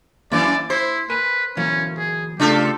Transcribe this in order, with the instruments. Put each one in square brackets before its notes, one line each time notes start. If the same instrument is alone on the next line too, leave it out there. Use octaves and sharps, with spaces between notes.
[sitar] F#2 E3 [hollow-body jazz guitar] A#3 [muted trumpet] D5
[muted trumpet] E4 [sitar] C5
[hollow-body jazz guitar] A#4 G#5 B5 [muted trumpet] B4
[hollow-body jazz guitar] E3 F#3 A#3 [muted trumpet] C#4
[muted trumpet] G#4
[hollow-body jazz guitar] C#3 A3 [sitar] D4 F4 A4 [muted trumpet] G4